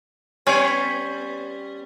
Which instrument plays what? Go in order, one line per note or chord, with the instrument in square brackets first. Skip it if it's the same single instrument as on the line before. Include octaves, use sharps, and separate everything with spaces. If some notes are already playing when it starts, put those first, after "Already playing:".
[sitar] G3 B3 C#5 [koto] C#4